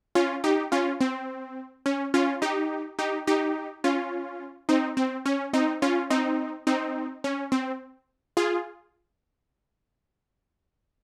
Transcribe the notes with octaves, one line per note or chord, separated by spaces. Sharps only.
C#4 F4
D#4 G4
C#4 F4
C4
C#4
C#4 F4
D#4 G4
D#4 G4
D#4 G4
C#4 F4
C4 D#4
C4
C#4
C4 D#4
C#4 F4
C4 D#4
C4 D#4
C#4
C4
F4 G#4